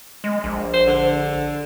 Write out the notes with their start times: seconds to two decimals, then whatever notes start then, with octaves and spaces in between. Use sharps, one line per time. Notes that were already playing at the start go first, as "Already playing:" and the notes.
0.24 G#3
0.44 A#1
0.73 C5
0.87 D3